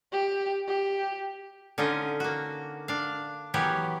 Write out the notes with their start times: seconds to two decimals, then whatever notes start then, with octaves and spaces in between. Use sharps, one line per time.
0.12 G4
0.67 G4
1.78 D3 C#4 D#4 F4 D#5
2.20 A#3 F#4
2.88 D4 F5
3.54 E3 F#3 B3 G4 A#4 C#5